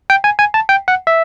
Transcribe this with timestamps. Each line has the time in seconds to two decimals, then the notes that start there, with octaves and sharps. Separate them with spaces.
0.10 G5
0.24 G#5
0.39 G#5
0.54 A5
0.69 G5
0.88 F#5
1.07 E5